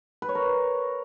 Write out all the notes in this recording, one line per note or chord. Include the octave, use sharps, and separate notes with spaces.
B4
C#5
A#4